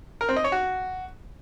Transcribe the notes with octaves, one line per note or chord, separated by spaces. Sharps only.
A#4
C4
D#5
C#5
F#4